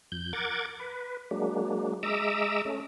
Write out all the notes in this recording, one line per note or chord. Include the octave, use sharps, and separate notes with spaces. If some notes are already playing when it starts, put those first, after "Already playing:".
F2 G6
A#4 F#5 D6 G#6 A6
B4
F#3 G#3 A#3 D4
G#3 D#5 E5 A#5 D6 E6
A3 C#4